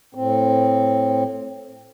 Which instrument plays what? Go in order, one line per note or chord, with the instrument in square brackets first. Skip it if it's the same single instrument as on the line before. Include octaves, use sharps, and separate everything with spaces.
[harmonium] A2 C4